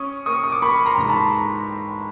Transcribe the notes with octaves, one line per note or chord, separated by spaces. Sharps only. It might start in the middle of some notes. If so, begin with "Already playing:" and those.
Already playing: C#4 C#6 D#6
A#3 C#6 D#6
D#6
D6
A#3 B5 C#6
A#5 C6
G#2 A#5
A5 B5